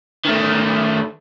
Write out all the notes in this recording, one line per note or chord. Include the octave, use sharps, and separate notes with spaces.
D#3 A3